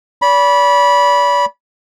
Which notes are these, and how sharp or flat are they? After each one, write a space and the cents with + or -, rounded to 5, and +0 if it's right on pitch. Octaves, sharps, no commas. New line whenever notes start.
D5 -40 B5 -15